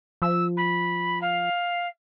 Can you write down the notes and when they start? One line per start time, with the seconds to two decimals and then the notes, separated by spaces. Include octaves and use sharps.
0.22 F3 E6
0.56 B5
1.21 F5